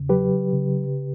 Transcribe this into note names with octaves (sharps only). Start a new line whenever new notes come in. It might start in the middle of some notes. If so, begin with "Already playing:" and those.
Already playing: E2 C#3
F#3 G4 B4
C#3